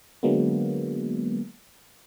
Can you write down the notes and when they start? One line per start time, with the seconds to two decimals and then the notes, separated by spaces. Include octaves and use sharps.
0.23 D3 F#3 G#3 A#3 B3